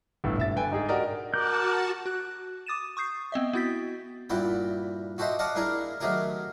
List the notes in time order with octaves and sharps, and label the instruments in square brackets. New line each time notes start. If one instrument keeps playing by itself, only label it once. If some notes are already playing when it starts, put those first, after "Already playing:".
[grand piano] G1 A2
D#1 E5 A6
D3 B4 G5 G#5
G#2 D#4 G#4
F#4 G4 A#4 D5 D#5 G5
[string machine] F#4 A5 [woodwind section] A#4 [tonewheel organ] D6 F#6 [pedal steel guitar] G6
[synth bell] F#4 F#6
D6 D#6 A6 D#7 E7
C#6 D#6 G6 C7
B3 C4 D#5 E5
B3 E4 F#4 G6 A6 B6
[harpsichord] G2 A#2 E4 F#4 G5
F#4 G4 A4 C5 D#5 E5
D5 D#5 F5 F#5 A5
A#3 D4 E4 G#4 A#4
D#3 F#3 A3 G4 G#4 A#4